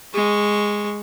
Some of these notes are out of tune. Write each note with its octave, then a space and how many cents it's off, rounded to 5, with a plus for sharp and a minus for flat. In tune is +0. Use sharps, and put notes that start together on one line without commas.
G#3 -5 C#6 +0